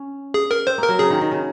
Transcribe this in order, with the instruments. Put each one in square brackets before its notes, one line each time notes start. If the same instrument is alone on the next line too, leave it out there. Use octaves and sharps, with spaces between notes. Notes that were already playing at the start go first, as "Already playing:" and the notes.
Already playing: [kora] C#4
[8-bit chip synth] G#4
A#4
[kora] C4 [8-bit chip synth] C5
[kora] A#3
[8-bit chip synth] A#4
[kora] F#3
[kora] C#3 [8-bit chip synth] G#4
[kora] D#3
D#3
C#3